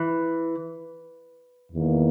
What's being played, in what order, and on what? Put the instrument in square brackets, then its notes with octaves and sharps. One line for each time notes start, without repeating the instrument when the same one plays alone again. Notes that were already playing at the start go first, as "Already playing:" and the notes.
Already playing: [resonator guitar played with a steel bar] E3
[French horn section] E2 D#3 A#3